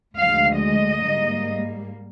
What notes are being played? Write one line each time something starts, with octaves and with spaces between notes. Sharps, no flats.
D2 D3 F3 G#3 F5
D#5
G#2 G3 A#3